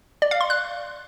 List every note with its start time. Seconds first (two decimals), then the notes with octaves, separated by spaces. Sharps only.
0.22 D5
0.31 F5
0.41 C6
0.50 F#6